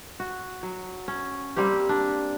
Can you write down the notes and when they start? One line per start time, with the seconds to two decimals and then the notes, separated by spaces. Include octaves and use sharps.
0.20 F#4
0.63 F#3
1.08 C#4
1.56 G3 A#3 C4 G4
1.89 D4